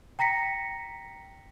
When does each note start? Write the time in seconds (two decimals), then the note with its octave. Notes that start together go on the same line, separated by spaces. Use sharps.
0.19 G5 A#5 A#6 B6 C#7